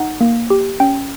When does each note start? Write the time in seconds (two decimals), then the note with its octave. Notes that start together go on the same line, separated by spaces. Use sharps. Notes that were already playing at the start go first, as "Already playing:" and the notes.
Already playing: D#4 F#5
0.21 A#3
0.50 G4
0.80 C#4 G5